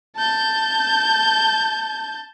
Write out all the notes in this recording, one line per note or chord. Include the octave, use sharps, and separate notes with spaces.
A5 G6